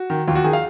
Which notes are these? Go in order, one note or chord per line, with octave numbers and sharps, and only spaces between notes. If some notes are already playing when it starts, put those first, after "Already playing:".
Already playing: F#4
D#3
D#2 F4
F#4
D#3 G#4
F5